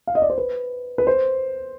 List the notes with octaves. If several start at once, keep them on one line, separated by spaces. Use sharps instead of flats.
F5
D#5
D5
C5
B4
B4
C5